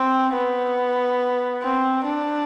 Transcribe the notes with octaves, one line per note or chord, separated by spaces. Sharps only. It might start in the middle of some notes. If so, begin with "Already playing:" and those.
Already playing: C4
B3
C4
D4